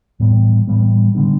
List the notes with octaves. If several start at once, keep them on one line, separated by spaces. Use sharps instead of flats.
A2 E3 G3 B3
A2 E3 G3 B3
D3 G3 B3 D4